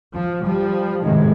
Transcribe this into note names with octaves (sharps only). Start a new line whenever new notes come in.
F3
F3 G3
A2 C3 D#3 G#3